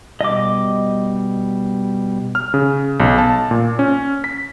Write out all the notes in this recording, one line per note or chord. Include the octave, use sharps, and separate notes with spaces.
B2 G3 D#5 D6
F6
C#3
B1
A5
A#2
C#4
B6